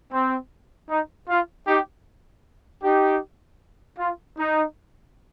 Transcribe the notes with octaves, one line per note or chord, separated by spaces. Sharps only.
C4
D#4
F4
D#4 G4
D#4 G4
F4
D#4